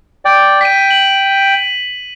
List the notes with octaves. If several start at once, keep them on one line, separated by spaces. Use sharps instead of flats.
D5 G5
G5 B6 D#7
F#7